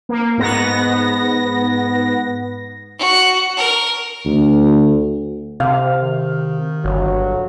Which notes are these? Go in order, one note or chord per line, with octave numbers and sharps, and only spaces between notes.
A#3
G#2 B3 A#6
F#4
A#4
D2
C3 F5
D#3
G1 F#3